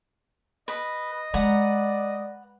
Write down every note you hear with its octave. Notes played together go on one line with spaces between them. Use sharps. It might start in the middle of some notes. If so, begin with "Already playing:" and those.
B4 D#5
G#3 B4 D5 F#5 A#5